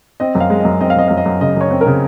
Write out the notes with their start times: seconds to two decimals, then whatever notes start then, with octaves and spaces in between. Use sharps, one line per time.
0.20 C4 D#5
0.35 F#2
0.40 F5
0.50 G#3
0.60 F#2 D#5
0.81 C4 D#5
0.90 F5
0.96 F#2 D#5
1.08 F#2 F5
1.17 D#5
1.26 F#2
1.41 C#3 D#5
1.56 F#2 C#5
1.71 C4
1.81 A#4
1.86 C#3